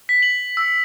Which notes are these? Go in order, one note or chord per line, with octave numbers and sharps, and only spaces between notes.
B6
F#7
E6